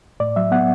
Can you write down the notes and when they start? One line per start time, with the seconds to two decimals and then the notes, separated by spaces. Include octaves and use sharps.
0.20 A2 D5
0.36 F#3 E5
0.51 B3 F#5